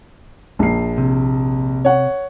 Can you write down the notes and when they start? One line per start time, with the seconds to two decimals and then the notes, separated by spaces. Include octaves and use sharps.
0.59 A#1 C7
0.98 C3
1.85 C#5 F#5